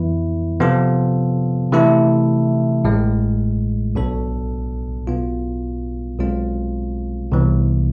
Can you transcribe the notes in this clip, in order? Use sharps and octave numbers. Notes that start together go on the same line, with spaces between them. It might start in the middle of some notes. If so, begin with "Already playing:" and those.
Already playing: F2 E3 B3 E4 B4
C3 F3 B3 F4 A4
C3 E3 A3 E4 A4
A1 A2 G#3
B1 B2 B3 D4 A4
B1 B2 B3 F4
B1 B2 G#3 C4 F4
C2 C3 E3 B3